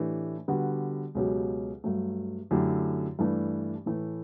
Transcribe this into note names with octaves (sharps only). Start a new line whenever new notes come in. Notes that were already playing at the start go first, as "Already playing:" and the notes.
Already playing: A2 E3 A3 D4 G4
D3 G3 B3 F#4
C#2 B2 F#3 C#4 G4
G2 F#3 A3
F#2 D3 A3 E4 G4
G2 E3 A3 D4
A2 E3 A3